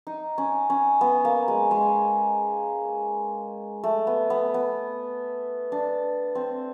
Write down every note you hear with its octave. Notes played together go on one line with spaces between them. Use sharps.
D#4
C#4
C#4
B3
A#3
G#3
G#3
A3
B3
B3
B3
D4
C4